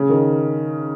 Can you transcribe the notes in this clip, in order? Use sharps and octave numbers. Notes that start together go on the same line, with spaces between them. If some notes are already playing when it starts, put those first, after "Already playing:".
Already playing: C#3
D#3